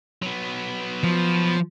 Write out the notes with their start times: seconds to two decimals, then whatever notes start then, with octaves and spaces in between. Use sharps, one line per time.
0.22 F#3 B3
1.04 F3